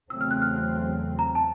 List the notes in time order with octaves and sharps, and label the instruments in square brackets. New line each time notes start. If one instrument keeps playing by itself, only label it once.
[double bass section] E2 C#3 F#3 A3 C4 [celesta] E6
[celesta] F6
F#6
F6
A#5
A5